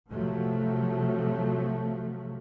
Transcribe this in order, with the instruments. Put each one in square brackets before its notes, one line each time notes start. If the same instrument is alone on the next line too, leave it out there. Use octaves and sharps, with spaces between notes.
[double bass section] C3 F3 F#3 A3